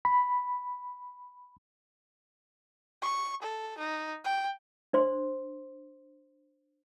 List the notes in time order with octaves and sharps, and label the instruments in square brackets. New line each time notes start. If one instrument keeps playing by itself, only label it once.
[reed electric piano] B5
[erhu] C#6
A4
D#4
G5
[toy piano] D4 C5 C6